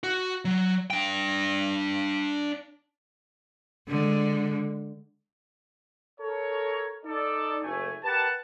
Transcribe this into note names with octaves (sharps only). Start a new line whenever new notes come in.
F#4
F#3
D4 G5
D3 G#3
A4 A#4 C#5
D#4 A4 D5
F#1 A3 G#5
G4 A#4 B4 F#5 A5